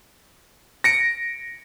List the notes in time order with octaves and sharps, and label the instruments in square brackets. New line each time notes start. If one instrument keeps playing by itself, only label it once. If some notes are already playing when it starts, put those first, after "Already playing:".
[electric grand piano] A#6 C#7 D7